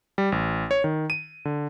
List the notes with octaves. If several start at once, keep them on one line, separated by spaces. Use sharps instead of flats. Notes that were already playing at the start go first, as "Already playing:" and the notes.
G3
A1
C#5
D#3
D#7
D3